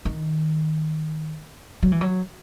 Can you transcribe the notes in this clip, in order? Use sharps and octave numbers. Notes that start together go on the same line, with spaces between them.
D#3
F#3
E3
F#3